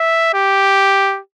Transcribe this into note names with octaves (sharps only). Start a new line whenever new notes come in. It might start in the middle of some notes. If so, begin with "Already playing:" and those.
Already playing: E5
G4